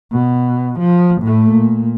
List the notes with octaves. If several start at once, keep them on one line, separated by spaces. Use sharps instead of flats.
B2
F3
A2 A3
A#2